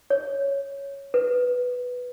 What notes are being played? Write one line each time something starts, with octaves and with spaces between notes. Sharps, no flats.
C#5
B4